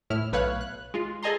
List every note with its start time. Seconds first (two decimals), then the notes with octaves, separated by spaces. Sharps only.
0.10 A2 E4 F6
0.32 B1 A3 B4 C#5 F5 F#6
0.61 F#6
0.94 G#3 F4
1.23 G#4 A4 D#5 G#5 A#5 C6